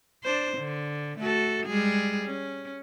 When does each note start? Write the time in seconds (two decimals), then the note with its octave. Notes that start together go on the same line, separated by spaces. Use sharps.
0.24 D4 C5
0.58 D3
1.19 A3 F#4 A4
1.67 G3 G#3 G#4
2.25 C#4